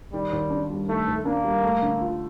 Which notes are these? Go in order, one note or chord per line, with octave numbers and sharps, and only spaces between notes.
D#3 G3
D#2
D4
G3
D#3 A3
D#2
A#3 D4
G3
A3
D3
F4